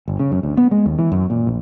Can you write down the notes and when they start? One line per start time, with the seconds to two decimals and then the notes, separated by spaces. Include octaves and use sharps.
0.08 G1
0.19 C#3
0.32 F#2
0.43 D2
0.57 B3
0.71 G#3
0.86 D#2
0.99 E3
1.12 F#2
1.30 A#2
1.47 A#1